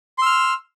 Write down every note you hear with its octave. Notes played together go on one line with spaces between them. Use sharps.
C6 E6 F6